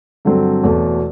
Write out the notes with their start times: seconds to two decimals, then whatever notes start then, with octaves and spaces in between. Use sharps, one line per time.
0.25 G2 D3 F#3 C4
0.63 E1 E2 B2 A3